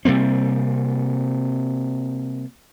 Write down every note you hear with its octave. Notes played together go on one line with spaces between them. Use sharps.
C3 G3 A#3 C4